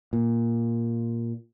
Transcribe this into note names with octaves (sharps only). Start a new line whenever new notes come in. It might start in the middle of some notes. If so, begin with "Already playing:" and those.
A#2